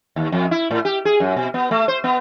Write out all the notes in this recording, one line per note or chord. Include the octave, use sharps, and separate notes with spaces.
D#2
F2
E4
A2
G4
G#4
F#2
B2
B3
A3
C5
B3